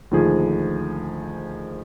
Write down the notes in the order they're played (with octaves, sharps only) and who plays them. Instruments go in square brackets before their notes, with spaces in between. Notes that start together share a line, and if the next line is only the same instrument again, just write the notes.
[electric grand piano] D2 A#2 D#3 F3 G#4